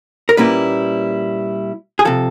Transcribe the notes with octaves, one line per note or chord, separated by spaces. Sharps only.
A#4
A#2 G3 A#3 C#4 E4 B4
G#4
C3 F3 A4